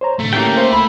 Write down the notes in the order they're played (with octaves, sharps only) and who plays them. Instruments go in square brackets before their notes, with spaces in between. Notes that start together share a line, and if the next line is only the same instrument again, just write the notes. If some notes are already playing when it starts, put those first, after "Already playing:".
[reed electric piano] C5 C#5 A#5
[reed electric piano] A2 D3 [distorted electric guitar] A3
[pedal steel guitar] A#3 C#4 G5 [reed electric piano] E4 G4
[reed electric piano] A#4 F5 A#5 [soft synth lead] C5
[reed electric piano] C2 [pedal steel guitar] E4 [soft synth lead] B5